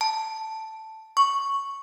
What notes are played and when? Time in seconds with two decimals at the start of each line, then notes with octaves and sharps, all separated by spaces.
0.01 A5
1.17 C#6